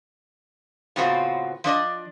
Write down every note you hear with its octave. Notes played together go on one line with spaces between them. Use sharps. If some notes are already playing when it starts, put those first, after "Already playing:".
A2 C#3 B3 C4 F4 F#4
F3 D4 D5 D#5